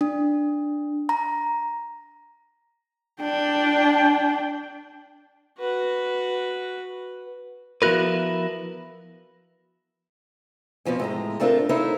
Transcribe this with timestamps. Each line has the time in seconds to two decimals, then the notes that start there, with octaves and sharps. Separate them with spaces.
0.01 D4
1.09 A#5
3.22 D4 G5
5.59 F#4 B4
7.82 F3 B3 E4 F#4 A#4 B4
10.85 F2 B2 F3 C#4
10.99 A2 G#3 A#5
11.40 A3 C4 D4 F4 F#4 A#4
11.69 D#4 E4 A4 C5 C#5 E5